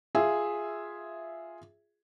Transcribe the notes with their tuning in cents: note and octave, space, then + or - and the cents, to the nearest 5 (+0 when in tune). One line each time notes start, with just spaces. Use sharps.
F4 +0 G#4 +0 E5 +0